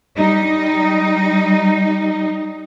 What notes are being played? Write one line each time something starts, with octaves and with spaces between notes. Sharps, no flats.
G3 D#4